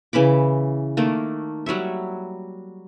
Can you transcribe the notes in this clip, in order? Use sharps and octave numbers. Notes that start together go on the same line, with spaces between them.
C#3 E3 B5 D6
D#3 A3 A#3
F#3 G3 C#5 E5